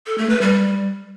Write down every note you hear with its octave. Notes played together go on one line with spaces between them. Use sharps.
A4
A3
B4
G3